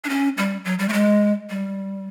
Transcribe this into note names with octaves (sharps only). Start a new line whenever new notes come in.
D4
C#4
G3
F#3
G3
A3
G#3
G3